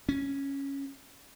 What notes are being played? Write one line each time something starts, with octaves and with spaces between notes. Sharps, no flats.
C#4